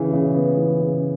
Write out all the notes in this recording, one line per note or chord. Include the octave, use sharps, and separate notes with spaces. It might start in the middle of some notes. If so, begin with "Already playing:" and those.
Already playing: C#3 E3
C#3
B3
E3
C#3